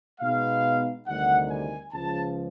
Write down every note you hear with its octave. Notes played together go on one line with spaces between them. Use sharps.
B2 G#3 B3 D#4 F5
D2 C3 D#3 G3 F#5
G#5
C#2 C#3 F3 A5